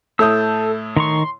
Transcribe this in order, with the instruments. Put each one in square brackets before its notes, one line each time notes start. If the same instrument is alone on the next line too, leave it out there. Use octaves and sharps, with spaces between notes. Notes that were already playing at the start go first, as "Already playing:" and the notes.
[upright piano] A2 E4 D#6 [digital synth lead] A4 [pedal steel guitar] E6 G6
[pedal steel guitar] D#3 A#5 C#6 [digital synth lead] C6